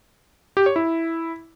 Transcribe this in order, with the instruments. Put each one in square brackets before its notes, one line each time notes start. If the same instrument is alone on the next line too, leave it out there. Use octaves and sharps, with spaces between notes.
[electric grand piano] G4
C#5
E4